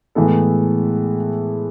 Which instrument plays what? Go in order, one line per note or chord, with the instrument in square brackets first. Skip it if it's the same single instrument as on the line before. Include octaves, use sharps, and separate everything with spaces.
[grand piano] A2 E3 G#3 B3 A4